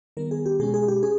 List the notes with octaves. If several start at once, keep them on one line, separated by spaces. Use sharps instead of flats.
D#3 G3 B3 A#4
G#4
G4
B2 G#3 C#4 G#4
G#4
G4
C#4 G#4